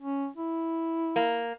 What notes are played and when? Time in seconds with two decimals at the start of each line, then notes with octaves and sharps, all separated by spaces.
0.01 C#4
0.37 E4
1.16 A#3